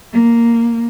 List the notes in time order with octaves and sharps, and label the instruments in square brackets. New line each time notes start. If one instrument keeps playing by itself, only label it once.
[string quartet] A#3